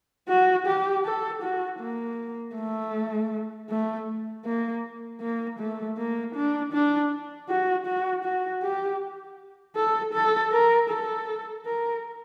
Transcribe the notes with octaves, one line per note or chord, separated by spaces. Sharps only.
F#4
G4
A4
F#4
A#3
A3
A3
A#3
A#3
A3
A#3
D4
D4
F#4
F#4
F#4
G4
A4
A4
A#4
A4
A#4